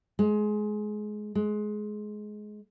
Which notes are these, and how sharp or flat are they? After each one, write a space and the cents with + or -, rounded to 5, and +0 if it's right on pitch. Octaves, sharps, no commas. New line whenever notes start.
G#3 +20
G#3 +20